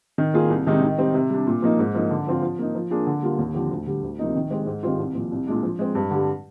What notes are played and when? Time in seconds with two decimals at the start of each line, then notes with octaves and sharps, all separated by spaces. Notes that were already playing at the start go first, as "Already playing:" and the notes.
0.18 D#3
0.34 A#3 F4 G#4
0.50 C2
0.67 C3 D#3 G#3 D#4
0.82 D#3
0.98 G3 C4 D#4
1.14 C3
1.30 G3 D4
1.47 A#2
1.62 F3 A#3 D#4
1.79 G#2
1.95 F3 A#3 D#4
2.10 D3
2.27 F3 C4 F4
2.42 F3
2.59 A#3 D#4
2.75 F3
2.91 A#3 D4 F4 G#4
3.07 D3
3.22 G3 A#3 F4
3.39 D#2
3.54 D3 F3 C4 G4
3.71 D2
3.87 D3 G3
4.03 D2
4.19 C3 F3 A#3 D#4
4.35 D#3
4.51 G#3 C4 G4
4.66 G#2
4.83 D#3 G3 C4 F4
4.99 C2
5.15 A#2 F3
5.32 C2
5.47 A#2 G#3 D4
5.63 F3
5.79 G#3 C4
5.95 G2
6.11 D3 G3